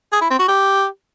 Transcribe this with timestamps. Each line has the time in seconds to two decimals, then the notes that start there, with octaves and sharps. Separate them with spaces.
0.12 G#4
0.21 E4
0.30 C4
0.39 F#4
0.48 G4